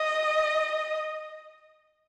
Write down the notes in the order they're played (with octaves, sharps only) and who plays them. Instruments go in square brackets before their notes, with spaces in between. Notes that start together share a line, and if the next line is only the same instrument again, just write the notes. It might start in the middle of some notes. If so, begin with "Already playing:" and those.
Already playing: [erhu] D#5